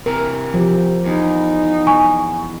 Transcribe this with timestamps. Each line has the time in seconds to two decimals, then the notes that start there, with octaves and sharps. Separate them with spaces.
0.06 C3 E3 A#4
0.54 F3 G4
1.05 E2 D#4
1.87 G#5 C#6